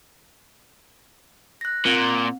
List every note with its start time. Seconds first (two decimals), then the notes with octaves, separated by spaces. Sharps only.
1.61 F#6 A#6
1.86 A#2 C4